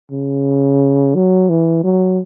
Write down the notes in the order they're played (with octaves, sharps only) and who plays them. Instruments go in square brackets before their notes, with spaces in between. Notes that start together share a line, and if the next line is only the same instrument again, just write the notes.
[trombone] C#3
F#3
E3
F#3